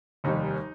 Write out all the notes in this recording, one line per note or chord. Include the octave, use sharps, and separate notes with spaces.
F1 D#2 D#3 G3 D#4